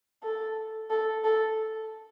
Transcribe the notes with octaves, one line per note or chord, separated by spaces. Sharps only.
A4
A4
A4